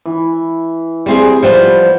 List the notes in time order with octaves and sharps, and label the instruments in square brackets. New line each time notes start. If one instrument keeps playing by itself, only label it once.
[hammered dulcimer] E3
[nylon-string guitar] G3 C4 G#4
F3 G3 B3